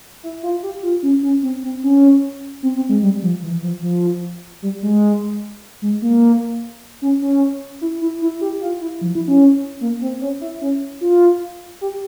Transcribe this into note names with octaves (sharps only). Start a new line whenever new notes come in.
E4
F4
G4
F4
C#4
C#4
C4
C4
C#4
C4
C4
G#3
G3
F3
E3
F3
F3
G3
G#3
G#3
A#3
C#4
C#4
E4
E4
E4
G4
F4
E4
F3
E4
C#4
A#3
C4
C#4
E4
C#4
F4
G4